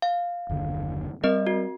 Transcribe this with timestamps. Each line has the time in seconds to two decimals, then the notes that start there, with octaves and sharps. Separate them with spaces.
0.02 F5
0.50 F#1 D#2 D3
1.24 G3 C4 A#4 D#5
1.47 F#4